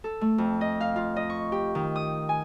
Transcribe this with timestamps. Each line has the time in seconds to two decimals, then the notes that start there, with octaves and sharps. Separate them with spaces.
0.04 A4
0.21 A3
0.38 F2
0.61 D#5
0.81 F5
0.96 F4
1.16 D#5
1.30 C#6
1.52 G4
1.75 D#3
1.96 D#6
2.29 G#5